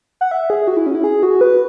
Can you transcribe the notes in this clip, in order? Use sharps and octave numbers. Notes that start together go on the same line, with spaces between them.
F#5
E5
G#4
F#4
E4
C#4
E4
G#4
F#4
B4